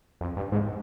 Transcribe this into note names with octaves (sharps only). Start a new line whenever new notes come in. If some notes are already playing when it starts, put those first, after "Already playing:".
F2
G2
G#2